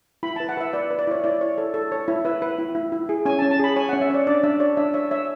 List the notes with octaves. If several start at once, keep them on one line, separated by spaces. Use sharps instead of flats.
E4 B5
A5
B4
F#5
B4 E5
B4 D5
B4
D5
E4 C#5
E4 D5
C#5
A4
A4
C#5
E4
B4 E5
B4
E4
E4
E4
G#4
C#4 G#5
A5
C#4
A5
G#4 B5
C#5 G#5
F#5
C#4
E5
C#5 D5
D4 D5
D4 E5
C#5 D5
D4 E5
C#5 E5
C#5 E5